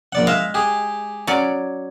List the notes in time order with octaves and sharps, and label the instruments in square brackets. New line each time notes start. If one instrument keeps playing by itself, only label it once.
[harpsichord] A#1 D5 F#5
[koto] G#3 [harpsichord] E5 F5
[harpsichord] G4 G#4
[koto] F#3 C#4 D5